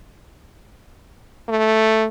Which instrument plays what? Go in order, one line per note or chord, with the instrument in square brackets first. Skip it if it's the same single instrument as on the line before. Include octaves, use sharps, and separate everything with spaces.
[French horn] A3